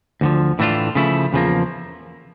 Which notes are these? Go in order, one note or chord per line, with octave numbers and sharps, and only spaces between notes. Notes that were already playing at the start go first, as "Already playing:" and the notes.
D2 D3 F3
A2 E3 A3 D4 F4
C#3 F3 A3 E4
E2 C#3 F3 A#3